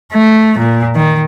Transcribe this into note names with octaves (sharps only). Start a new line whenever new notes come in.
A3
A#2
D#3